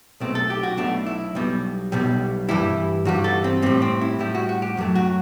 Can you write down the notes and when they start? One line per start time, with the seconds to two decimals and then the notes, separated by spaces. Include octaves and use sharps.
0.20 B1 B2 A3 C4
0.35 A4
0.50 G4
0.63 F#4
0.77 B1 B2 A3 D4
1.06 E4
1.35 B1 B2 G3
1.92 B1 B2 G3
2.49 G2 E3 G3 E4
3.05 G2 E3 G3 F#4
3.24 A4
3.44 C4
3.62 A2 G3 C4
3.82 C4
4.01 E4
4.19 A2 G3 E4
4.35 F#4
4.49 F#4
4.62 G4
4.77 F#2 F#3 A3 G4
4.95 F#4